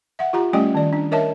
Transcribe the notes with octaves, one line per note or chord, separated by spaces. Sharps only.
E5 F#5
F4 G4 A#5
G3 A3 C#4 G4 D#5 G5
D#3 D5
D4
A#4 C#5 D#5 E5 A5